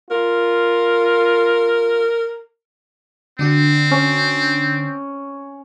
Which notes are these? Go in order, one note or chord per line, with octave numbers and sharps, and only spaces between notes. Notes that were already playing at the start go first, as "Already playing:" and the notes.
F4 A#4
D3 C4 D4 F#4
C#4